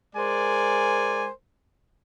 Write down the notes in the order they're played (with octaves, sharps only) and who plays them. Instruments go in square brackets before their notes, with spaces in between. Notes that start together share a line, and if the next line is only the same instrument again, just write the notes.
[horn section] G#3 A#4 C5 D5 G#5